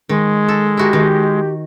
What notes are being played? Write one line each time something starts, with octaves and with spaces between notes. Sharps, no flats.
D#3 G#3
A4
E4 F#4 G4 A#4
D#3